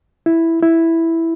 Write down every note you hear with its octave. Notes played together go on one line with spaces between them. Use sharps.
E4
E4